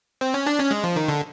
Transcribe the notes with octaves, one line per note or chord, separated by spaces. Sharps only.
C4
C#4
D4
C#4
G#3
F3
D#3
D3